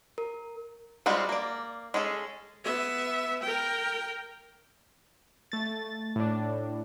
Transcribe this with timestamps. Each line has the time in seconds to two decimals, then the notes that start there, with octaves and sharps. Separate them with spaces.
0.18 A#4
1.06 G3 G#3 C4 F4 F#4
1.29 A#3 D5
1.94 G#3 C#4 G#4 A4
2.65 B3 E5
3.43 A#4 G5
5.52 A3 A6
6.16 A2 D4